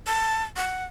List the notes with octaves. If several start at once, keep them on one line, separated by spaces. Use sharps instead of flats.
A5
F#5